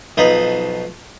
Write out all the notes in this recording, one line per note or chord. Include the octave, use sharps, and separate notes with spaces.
B1 F3 D#4 B4 D#5